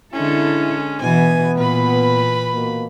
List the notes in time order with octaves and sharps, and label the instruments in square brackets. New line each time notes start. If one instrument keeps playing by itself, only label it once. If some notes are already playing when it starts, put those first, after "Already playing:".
[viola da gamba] D3 A4 [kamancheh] G#3 C#4 [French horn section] E4
[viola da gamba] B2 E3 E4 [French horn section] B3 [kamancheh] G#5
[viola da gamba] A#2 [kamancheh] B4 B5
[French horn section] B2 A#3